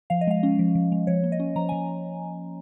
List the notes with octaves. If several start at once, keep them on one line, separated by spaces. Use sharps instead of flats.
F3 F5
D#5
G#3 F5
C#4
F3
F3
G#3
F3 C#5
A#3
D#5
C#4
F3 A#5
F3 G#5